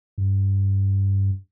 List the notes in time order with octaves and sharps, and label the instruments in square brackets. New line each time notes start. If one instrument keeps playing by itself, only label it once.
[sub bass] G2